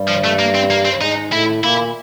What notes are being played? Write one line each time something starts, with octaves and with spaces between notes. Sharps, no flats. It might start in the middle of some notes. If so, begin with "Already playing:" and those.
Already playing: G2 G3
F3
A3
A#3
C4
A#3
C4
G#2 G#3 D#4
A2 A3 E4
A#2 A#3 E4